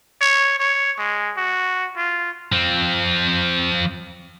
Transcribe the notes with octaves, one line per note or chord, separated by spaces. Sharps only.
C#5
C#5
G#3
F#4
F4
F3 C4